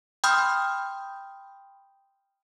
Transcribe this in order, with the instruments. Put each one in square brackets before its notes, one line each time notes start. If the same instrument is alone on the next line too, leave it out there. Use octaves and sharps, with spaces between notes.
[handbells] G5 B5 C6 D#6 F6 G6